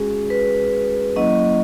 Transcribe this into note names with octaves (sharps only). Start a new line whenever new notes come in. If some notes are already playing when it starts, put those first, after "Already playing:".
Already playing: G#3 C#4 F#4 G#4
B4
F#3 A#3 C#4 E4 D#5